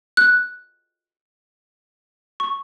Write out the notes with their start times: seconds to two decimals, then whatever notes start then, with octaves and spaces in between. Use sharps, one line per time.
0.17 F#6
2.40 C#6